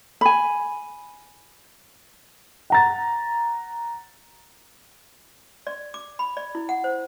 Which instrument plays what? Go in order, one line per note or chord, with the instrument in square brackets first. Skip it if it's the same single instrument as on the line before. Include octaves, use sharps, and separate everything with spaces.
[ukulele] G#5 B5
[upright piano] F#5 A#5 A6
[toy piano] D5
D6
B5
D5
E4
F#5
C5